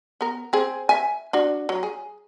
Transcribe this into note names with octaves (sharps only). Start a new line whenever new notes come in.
B3 A#4
C4 G#4
E5 G#5
D4 F#4
F#3
G#4